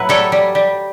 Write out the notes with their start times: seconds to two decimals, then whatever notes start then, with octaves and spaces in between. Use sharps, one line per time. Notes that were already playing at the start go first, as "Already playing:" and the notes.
Already playing: A2 F#3 B4 E5
0.09 G3 A4 C#5
0.32 G3
0.55 G3